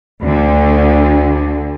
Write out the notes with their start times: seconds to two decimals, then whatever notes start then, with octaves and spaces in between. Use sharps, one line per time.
0.22 D2 D3